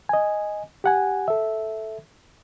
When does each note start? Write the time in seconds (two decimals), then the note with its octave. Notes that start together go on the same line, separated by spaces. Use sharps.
0.09 D#5 G#5
0.84 G4 F#5 G#5
1.28 A4 E5